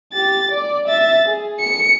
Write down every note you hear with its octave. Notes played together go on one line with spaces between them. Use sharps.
G4 A6
D5
E5 A6
G#4
C#7